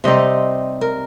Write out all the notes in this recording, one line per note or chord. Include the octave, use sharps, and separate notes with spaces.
C3 G3 C4 D#4 D#5
A#4